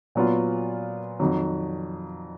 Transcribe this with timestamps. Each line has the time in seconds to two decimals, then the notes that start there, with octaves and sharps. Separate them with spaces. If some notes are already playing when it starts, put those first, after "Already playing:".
0.15 A#2 F#3 B3 F4
1.20 F2 D#3 F#3